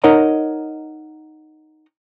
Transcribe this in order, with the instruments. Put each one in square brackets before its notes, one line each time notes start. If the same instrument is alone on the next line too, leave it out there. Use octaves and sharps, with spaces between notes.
[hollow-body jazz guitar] D#4 A#4 C#5 D#5 F#5 A#5